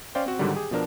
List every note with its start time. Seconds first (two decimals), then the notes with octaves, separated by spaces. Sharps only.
0.15 C#4 C5 D5 F5 G5
0.26 C4 F#4
0.39 G#2 D3 D#3 F#3 G3
0.54 G4 G#4
0.71 B2 F3 D4 A#4